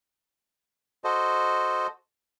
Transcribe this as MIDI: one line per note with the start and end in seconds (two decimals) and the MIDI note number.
1.04 1.87 66
1.04 1.87 69
1.04 1.87 72
1.04 1.87 75